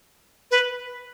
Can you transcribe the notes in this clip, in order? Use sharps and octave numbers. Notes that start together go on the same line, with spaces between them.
B4